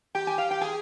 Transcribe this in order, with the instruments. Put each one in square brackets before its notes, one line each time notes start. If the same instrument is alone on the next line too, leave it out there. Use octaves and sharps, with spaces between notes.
[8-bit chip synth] G4 [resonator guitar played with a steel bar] G5
[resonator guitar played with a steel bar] G#5
F5
G5
[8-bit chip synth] G#4 [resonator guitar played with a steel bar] G#5